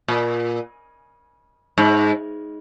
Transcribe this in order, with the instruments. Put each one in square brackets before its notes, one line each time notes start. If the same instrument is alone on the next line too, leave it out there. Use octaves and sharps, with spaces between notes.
[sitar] A#2
G#2